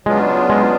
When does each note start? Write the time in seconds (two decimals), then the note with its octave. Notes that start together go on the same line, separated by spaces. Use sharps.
0.06 C#3 F#3 G#3 B3 D4 F4
0.49 G#3